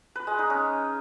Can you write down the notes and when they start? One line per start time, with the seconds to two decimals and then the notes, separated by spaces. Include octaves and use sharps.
0.15 B4
0.27 G#3
0.38 D#4
0.50 C#4